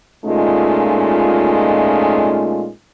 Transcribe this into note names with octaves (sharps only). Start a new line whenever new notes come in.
A#2 G#3 A3 C#4 D#4 F4